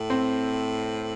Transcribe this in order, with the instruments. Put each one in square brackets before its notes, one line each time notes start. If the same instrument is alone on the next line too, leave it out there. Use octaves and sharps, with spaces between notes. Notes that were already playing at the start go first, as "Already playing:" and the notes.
Already playing: [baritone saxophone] A2
[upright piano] C4